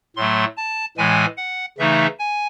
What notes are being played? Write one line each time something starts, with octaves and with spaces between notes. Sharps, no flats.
A2 F#3 A3 C6
A5
A2 E3 G#3 G#5
F#5
C#3 E3 A3 D#4 E5
G#5